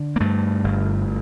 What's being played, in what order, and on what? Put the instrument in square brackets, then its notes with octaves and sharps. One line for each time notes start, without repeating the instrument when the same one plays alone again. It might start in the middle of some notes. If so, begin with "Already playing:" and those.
Already playing: [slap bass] D3
A#3
G2 A3
G1